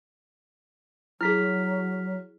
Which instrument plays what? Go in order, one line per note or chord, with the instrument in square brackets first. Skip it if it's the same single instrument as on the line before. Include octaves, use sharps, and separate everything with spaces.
[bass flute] F#3 [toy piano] E4 G#4 [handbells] F6 B6